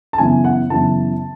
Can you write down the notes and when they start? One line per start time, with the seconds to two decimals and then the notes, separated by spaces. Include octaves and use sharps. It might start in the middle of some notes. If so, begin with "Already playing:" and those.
0.13 A5
0.18 F#2 C#3 E3 B3 G#5
0.44 F#5
0.70 F#2 C#3 E3 B3 A5